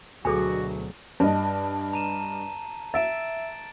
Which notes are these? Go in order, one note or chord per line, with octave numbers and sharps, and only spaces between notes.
D2 B2 F#3 F#4 G#4 A4 G#5
G2 D#5 A5
A#5 D#7 E7
E5 A6 D7 E7